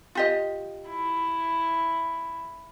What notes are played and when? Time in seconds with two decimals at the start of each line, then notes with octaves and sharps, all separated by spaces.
0.15 F4 G4 D#5
0.89 E4